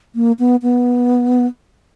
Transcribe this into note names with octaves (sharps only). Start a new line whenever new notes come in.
A#3
B3
B3